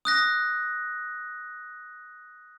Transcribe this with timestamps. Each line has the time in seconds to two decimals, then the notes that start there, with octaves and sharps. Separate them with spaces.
0.05 D#6 F#6 A#6